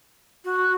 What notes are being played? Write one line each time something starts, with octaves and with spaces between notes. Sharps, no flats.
F#4